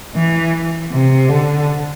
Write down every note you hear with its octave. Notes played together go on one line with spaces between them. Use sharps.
E3
C3
D3